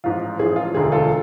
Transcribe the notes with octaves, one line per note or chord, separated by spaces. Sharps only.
A1 G#2 F3 F4
A1 G#2 F3 G#4
F4
E1 D2 D3 G#3 G#4
F4 A4